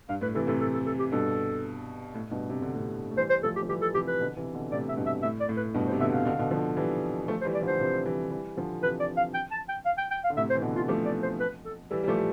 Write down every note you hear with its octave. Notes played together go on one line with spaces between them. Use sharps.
G2 F5
A2 B4
C3 E3 A4
A2 C3 A4
A4
A4
A4
G4
G2 B2 A4
A2
G2 B2
C3
D3
A2 C3
A3
E3 G3 C5
C5
F3 A3 A4
G4
F3
E3 G3 G4
A4
C3 E3 G4
B4
B2 D3
C3 E3
B2 D3
A2 C3 D5
E5
G2 B2
E5
A2 E5
D5
A2
B4
G2 B2
C5
C3
B2 D3 E5
F5
B2 D3
B2 D3
D3 F3
E3 G3
F3 A3
C5
E3 G3
D5
D3 F3
C5
C3 E3
E3 G3
E3 G3
D3 F3
C3 E3 B4
D5
F5
G5
A5
G5
F5
G5
G5
F5
D3
A2 C3 E5
C5
E3
B2 D3
F4
F3 A3 G4
D5
C5
B4
A4
E3 G3 A4
G3
F3 A3 G4